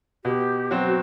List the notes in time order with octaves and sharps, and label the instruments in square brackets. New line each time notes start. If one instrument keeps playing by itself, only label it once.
[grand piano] B2 [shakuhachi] G4
[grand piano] F#3 C4 [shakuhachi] F#4